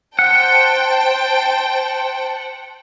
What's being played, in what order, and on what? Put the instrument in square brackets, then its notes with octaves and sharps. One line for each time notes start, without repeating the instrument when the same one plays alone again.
[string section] C5 G5 A5 [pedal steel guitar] F#5